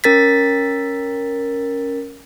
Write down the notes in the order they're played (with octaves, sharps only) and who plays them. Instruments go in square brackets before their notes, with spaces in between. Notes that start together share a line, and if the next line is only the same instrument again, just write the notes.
[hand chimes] C#4 A#4 A6 B6